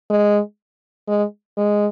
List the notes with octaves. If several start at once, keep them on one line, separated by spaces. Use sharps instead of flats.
G#3
G#3
G#3